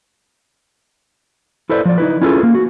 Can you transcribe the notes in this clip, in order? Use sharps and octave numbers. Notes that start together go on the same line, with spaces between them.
E4 A4 B4 C5 D5
F3 D5
D#4 E4 B4
C#4 E4 F4 G#4 A4 B4
A#3
F#4